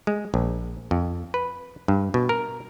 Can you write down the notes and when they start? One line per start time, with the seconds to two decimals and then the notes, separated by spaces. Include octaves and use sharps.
0.07 G#3
0.34 A#1
0.91 F2
1.34 B4
1.88 G2
2.14 B2
2.29 A#4